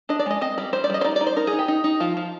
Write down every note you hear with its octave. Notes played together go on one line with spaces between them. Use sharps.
D4 D#5
D5
G#3 D#5
C4 D#5
G3 D5
G3 C5
D5
G3 D#5
C5
D#4 D5
D#4 D5
C5
D#4 A#4
G#4
D#4
G4
D#4
D#4
F3 F4
F3